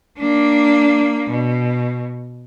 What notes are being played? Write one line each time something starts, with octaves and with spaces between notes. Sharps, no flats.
A#3 D4
B2